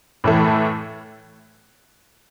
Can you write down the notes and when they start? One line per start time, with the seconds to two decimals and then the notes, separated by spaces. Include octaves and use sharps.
0.24 A2 E3 A3